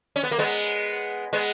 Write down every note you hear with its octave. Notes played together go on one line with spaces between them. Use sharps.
C#4
B3
A#3
G#3 B3
G#3 B3